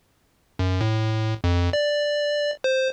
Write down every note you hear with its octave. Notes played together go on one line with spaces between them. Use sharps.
F#2
A2
F2
D5
C5